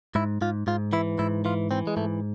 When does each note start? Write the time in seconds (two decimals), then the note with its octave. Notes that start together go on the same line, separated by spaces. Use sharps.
0.15 G#2 E4
0.41 G#2 F4
0.67 G#2 F4
0.93 E3 E4
1.19 G#2 E4
1.45 E3 F4
1.71 E3 C4
1.87 G#3
1.97 G#2 A3